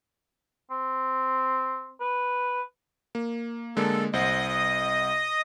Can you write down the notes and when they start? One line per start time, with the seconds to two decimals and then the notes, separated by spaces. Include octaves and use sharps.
0.70 C4
2.00 B4
3.15 A#3
3.76 D3 G#3 A#3 A4
4.13 C2 C5 D#5 F#5 D#6